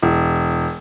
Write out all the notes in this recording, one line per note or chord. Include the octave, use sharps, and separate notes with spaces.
E1